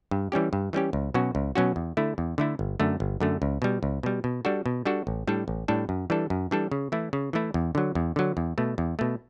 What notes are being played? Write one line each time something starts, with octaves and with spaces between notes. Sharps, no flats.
G2
E3 G3 C#4 G4
G2
E3 G3 C#4 G4
C#2
B2 F#3 C#4 F#4
C#2
B2 F#3 C#4 F#4
E2
D3 A3 E4
E2
D3 A3 E4
G1
F#2 D3 A3
G1
F#2 D3 A3
C#2
B2 G3
C#2
B2 G3
B2
G3 D4 F#4 A4
B2
G3 D4 F#4 A4
A1
A2 G3 D4 A4
A1
A2 G3 D4 A4
F#2
E3 G3 D4 A4
F#2
E3 G3 D4 A4
C#3
E3 A3 E4
C#3
E3 A3 E4
E2
D3 F#3
E2
D3 F#3
E2
B2 A3
E2
B2 A3